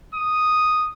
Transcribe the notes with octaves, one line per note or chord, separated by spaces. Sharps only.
D#6